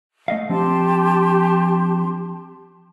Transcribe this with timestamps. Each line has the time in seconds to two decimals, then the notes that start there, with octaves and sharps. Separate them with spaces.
0.28 A3 D#5 F5
0.49 F3 C4 D4 G4 A5 C6